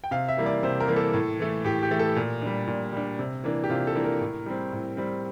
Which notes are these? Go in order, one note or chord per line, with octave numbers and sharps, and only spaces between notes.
G5
C3 F5
E5
E3 G3 A#3
D5
C3 C5
A#4
E3 G3 A#3
A4
A2
E3 A3
A2 G4
G4
E3 A3
A4
A#2
G3 D4
A#2
G3 D4
C3
E3 A#3 D4
G4
C3 F4
A4
E3 A#3 D4
A#4
A2
G3 C4
A2
G3 C4